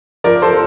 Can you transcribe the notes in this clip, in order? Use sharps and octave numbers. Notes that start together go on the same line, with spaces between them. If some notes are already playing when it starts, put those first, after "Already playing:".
F3 A#4 D5
F3 A4 C5